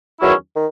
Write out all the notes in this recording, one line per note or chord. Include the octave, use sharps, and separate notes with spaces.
E2 D#3 F#3 C#4 E4
D#3